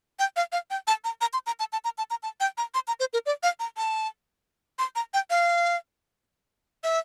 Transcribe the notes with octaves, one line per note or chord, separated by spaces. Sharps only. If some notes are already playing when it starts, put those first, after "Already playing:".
G5
F5
F5
G5
A5
A#5
A#5
C6
A#5
A5
A5
A#5
A5
A#5
A5
G5
A#5
C6
A#5
C5
A#4
D5
F5
A#5
A5
C6
A#5
G5
F5
E5